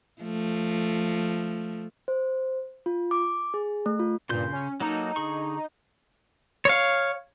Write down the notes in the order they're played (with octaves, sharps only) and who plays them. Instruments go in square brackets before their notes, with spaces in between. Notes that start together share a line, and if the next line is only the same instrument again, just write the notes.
[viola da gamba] F3 A3
[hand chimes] C5
F4
D6
G#4
A3
F4
[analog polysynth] G2 A#2 [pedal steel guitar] C#3 C6 G6
[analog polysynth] C#4
[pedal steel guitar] F#3 A#3 A4 [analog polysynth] D#4
[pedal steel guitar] D3 G#4 C#6
C#5 F5